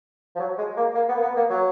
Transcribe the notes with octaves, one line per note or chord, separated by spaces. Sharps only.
F3
F#3
G#3
A#3
A#3
B3
A#3
B3
A#3
F#3